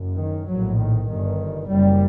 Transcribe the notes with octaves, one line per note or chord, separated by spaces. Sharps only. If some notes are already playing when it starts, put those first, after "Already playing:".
Already playing: F#1 F#2
D#3
A#1 A2 F#3
D#3
G1 G2 D#3
F#1 F#2 G3